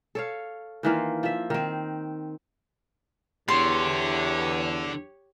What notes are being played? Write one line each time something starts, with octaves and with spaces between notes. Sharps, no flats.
A4 C#5 F5
D#3 E3 A#3 F4
F3 E5
D#3 C4
E2 D3 G4 C#5 C6